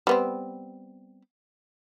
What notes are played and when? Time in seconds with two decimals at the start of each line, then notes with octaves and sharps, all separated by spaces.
0.07 G3 B3 C4